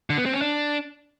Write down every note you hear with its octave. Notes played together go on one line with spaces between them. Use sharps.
D3
B3
C4
C#4
D4